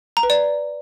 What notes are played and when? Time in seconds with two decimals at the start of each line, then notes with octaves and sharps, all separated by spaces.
0.17 A#5
0.23 B4
0.30 D5